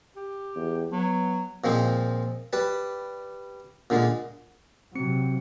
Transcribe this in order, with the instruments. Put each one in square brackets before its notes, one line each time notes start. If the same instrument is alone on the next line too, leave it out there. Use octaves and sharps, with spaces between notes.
[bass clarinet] G4
[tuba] E2
[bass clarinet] F#3 [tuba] B3
[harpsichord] A#2 F3 G#3 C4
G3 B4 A5
A#2 D3 G#3
[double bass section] C3 F#3 [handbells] C4 C#7